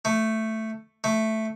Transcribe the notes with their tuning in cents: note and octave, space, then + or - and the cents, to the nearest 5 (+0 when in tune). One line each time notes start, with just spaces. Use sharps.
A3 +5
A3 +0